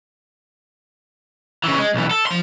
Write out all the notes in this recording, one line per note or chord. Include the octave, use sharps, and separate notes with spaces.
C#3 E3
G#3
B1 E3
A4
F3 C6